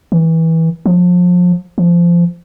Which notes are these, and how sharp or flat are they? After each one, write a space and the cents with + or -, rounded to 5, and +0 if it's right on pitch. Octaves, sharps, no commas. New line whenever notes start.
E3 -20
F3 +30
F3 -20